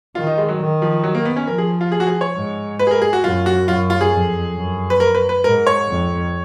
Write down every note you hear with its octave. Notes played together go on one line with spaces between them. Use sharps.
D#3 F4
D#4
G#3
F#3
D#3
F3
F#3
A#3
B3
C#4
F3 A#4
G#4
F4
G#4
F#4
G#4
C#5
G#2
B4
G#4
A#4
G#4
F#4
F#2 F4
F#4
F#2 F4
F4
G#4
F2
F#2
B4
A#4
B4
B4
G#2 A#4
C#5
F2